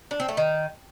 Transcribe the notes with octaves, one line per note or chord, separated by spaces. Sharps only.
D4
C4
A3
D#3